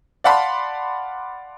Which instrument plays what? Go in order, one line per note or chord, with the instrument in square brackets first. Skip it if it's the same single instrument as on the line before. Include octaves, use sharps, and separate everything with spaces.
[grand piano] D5 F5 F#5 A5 B5 C6